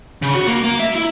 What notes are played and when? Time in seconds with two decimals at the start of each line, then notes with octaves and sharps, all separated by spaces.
0.22 C#3
0.35 F#4
0.47 A#3
0.64 A#3
0.80 E5
0.95 E4